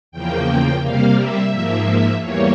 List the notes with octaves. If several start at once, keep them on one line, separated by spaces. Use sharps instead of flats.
E2 C#3 F3 A#3 G5
C3 G3 A#3 F5
E5
G#2 F3 A#3
E2 E3 G3 A#3 C#5